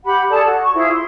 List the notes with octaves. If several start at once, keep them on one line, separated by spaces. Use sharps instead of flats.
G4 F#5 B5
G#4 A4 D5 A5
F#4
C#6
E4 F4 G#4 C5
C6